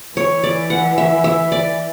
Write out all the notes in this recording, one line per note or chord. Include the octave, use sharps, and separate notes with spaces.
E3 C#5
D5
F#5
E5
E5
D5